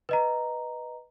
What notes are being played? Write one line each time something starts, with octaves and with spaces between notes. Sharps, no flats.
B4 D#5 A#5